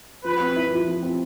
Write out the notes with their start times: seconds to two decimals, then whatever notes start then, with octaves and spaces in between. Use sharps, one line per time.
0.24 F3 B4
0.40 C4
0.56 E4
0.71 F3
0.88 F3
1.03 C4